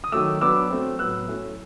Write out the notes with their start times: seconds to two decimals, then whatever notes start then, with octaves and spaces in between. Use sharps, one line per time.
0.04 D#6
0.12 D#3 F#3 A3 D6 E6
0.41 F#3 B3 D4 D6 E6
0.70 F#3 A3 C4
0.99 A2 F#3 B3 E6 F#6
1.28 F#3 A3 C#4 E4